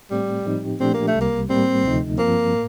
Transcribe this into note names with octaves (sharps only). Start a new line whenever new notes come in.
A2 G3 A3 C4
A2 F3 C4 D#4 G4
A#2 F3 A3 C4 D4 G4
A#3
A3
C2 C3 G3
A#3
A2 G3 A#3 C4
D2 C3 F3 A3 D#4
G2 F3 A#3 C4
A2